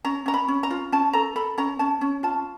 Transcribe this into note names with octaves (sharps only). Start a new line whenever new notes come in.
C#4 A#5
C#4 A#5
B5
C#4
A#5
F4
C#4 A5
A4 A#5
A4 B5
C#4 A#5
C#4 A5
C#4
F4 A5